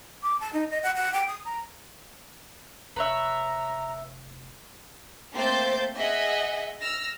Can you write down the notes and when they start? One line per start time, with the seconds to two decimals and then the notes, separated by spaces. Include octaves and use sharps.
0.22 D6
0.40 A5
0.53 D#4
0.70 D#5
0.83 F#5
0.95 F#5
1.14 G5
1.28 D#6
1.45 A#5
2.96 F1 B4 C#5 E5 A#5
5.34 A3 A#3 C4 C5 G6 A6
5.96 G#4 D#5 E5 F#5 G#5
6.81 E6 F6 A#6